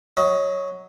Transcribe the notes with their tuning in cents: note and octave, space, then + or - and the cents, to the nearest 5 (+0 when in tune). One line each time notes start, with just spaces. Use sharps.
F#3 +0 D#5 +20